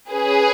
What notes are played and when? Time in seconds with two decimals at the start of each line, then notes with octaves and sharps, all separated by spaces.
0.10 C#4 G#4 B4